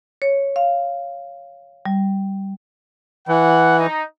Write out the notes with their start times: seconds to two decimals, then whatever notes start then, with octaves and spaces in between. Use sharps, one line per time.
0.22 C#5
0.56 F5
1.86 G3
3.28 E3 F#5
3.78 D#4